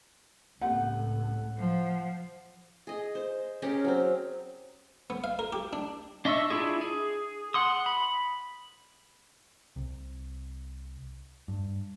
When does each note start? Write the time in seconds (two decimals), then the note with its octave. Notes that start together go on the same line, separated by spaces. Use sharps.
0.61 C#2 A2 A#3 C4 G4 F#5
1.58 F3
2.87 G#4 D#5
3.15 C5
3.62 C#4 G4 G#4 A#4
3.84 F#3 C4
5.10 B3
5.24 F5
5.39 A#4
5.53 G4
5.73 D4
6.25 D4 D#5 E5 C#6 E6
6.50 D4 E4 F4 G#4
6.81 G#4
7.54 F#5 C6 D#6
7.86 B5
9.76 C2
11.48 G2